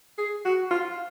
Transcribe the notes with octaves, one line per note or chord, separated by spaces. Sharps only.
G#4
F#4
F4